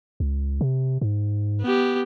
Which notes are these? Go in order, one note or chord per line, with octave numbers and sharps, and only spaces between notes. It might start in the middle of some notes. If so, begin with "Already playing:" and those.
C#2
C3
G#2
B3 G4